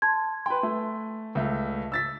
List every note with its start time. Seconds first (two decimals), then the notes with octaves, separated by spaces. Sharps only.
0.02 A5 C6 G#6
0.46 B4 G5 G#5 C6
0.63 A3
1.35 C#2 A3
1.92 E6 A6 B6